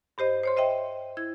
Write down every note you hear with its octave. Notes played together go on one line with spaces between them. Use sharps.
G2 G4 C5 D#5
C5 C#5 C6
C5 D#5 E5 G5
E4 G#6